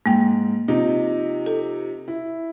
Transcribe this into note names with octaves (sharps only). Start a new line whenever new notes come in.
G#2 A#3 G5
C3 F3 D#4
A4
E4